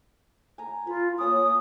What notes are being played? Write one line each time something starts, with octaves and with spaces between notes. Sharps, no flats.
G#5 A#5
F4 B4
A#3 C#4 D6 D#6